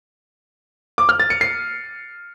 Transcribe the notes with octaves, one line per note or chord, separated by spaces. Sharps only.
D6
F6
A6
C#7
C7